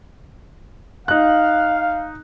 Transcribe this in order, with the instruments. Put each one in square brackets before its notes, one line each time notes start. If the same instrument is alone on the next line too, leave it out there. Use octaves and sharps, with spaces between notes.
[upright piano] D#4 F#6 [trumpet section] F5